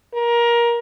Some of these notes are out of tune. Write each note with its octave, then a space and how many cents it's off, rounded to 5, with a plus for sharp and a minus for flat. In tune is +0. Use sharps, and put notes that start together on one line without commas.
A#4 +20